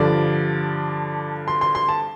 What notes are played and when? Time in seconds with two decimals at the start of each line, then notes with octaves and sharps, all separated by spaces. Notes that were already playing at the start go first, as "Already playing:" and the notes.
Already playing: G2 D3 F3 D5
1.48 C6
1.61 C6
1.75 C6
1.89 A5